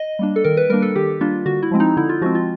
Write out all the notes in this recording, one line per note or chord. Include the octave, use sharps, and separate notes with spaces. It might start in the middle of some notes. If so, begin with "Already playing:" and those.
Already playing: D#5
G3 A#3 D4
A4
D#3 A#4
B4
G3 A#3 D4 A#4
A4
D#3 G4
G3 A#3 D4 F4
D3 F#4
E4
F3 G#3 C4
D#4
D3 E4
F4
F3 G#3 C4 F#4
F4